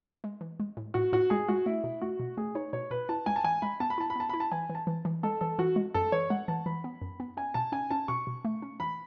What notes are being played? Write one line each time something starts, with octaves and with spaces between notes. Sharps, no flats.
G#3
E3
G#3
A2
A2 F#4
A2 F#4
G#3 G#4
G#3 F#4
A3 E4
B2
A3 F#4
B2
A3 G#4
D#4 C#5
B2 C#5
B2 B4
E4 A5
G#3 G#5
A5
E3 G#5
G#3 B5
B3 A5
B5
E4 A5
B5
B3 A5
E4 B5
A5
E3 G#5
E3
A5
E3
E3
G#3 A4
E3 A4
E3 F#4
G#3
F#2 A4
E3 C#5
G#3 F#5
E3 A5
E3 B5
B3
F#2
B3
C#4 G#5
B2 A5
C#4 G#5
C#4 A5
B2 C#6
B2
A3
C#4
E3 B5